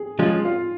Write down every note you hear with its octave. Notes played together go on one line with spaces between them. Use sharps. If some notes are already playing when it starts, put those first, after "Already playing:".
Already playing: G#4
F3 G#3 C#4 F4
F4